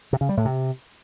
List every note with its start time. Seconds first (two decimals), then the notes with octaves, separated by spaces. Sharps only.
0.13 C3
0.21 C#3
0.29 G3
0.37 A2
0.45 C3